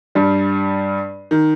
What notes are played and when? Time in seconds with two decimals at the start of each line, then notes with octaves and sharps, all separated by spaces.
0.15 G2 G3
1.31 D#3